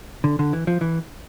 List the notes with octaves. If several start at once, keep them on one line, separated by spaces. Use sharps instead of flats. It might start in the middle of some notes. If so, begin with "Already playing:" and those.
D3
D3
E3
F3
E3